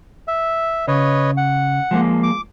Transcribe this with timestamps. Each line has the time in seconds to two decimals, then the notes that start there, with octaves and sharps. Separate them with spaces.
0.28 E5
0.88 C#3 B4 C#5 D#5
1.37 F#5
1.91 F3 G#3 A#3
2.23 D6